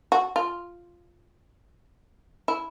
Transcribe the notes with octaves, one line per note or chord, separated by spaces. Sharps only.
F#4
F4
E4